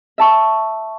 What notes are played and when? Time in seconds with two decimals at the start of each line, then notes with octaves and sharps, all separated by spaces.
0.18 E5 A5 C#6